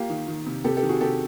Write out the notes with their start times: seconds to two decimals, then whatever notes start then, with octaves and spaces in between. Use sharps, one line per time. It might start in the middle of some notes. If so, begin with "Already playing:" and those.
Already playing: A#3 F4 G4
0.10 D#3
0.28 D#3
0.46 C3
0.64 C3 G4 A4
0.77 G4 A4
0.83 D#3
0.89 F#4 G#4
1.01 C3 G4 A4